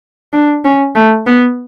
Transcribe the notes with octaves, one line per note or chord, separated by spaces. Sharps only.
D4
C#4
A3
B3